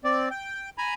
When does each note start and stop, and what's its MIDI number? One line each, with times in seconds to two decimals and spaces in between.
0.04 0.29 60
0.04 0.29 74
0.31 0.70 79
0.78 0.94 80
0.78 0.94 82
0.78 0.94 83